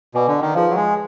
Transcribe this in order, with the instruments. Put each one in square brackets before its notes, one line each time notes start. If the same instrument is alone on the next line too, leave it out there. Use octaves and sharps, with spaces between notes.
[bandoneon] B2 [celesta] B4 D5 G#5 D6
[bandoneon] D3
D#3
[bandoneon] F3 [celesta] G#4 B4 F5
[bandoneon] F#3
G#3